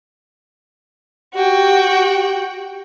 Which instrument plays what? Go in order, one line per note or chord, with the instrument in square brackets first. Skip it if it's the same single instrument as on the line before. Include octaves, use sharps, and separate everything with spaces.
[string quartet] F#4 G5 [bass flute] G4